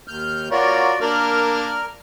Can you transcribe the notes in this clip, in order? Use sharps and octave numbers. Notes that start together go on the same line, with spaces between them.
D#2 F6 G6
F4 F#4 A#4 C#5 D5
A#3 D4 A#4 D5 F6